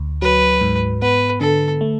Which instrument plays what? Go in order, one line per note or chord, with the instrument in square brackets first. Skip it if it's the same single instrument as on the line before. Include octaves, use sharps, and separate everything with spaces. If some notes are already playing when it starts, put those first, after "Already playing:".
Already playing: [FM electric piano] D2
[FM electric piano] F#3 [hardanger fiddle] B4
[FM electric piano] G#2
[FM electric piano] B3 [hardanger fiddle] B4
[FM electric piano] D3 [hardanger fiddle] A4
[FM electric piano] A3